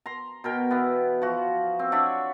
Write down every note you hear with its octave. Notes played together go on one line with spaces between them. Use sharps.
A#5 C6
B2 A#4 G5
E3 B3
F3 F#4
C4
D4 C#5 E5 F#5